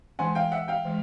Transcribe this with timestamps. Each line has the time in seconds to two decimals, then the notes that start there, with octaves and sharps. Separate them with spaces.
0.19 E3 G#3 C#4 F#5 G#5
0.35 F5 G5
0.52 E5 F#5
0.68 F5 G5
0.85 E3 G#3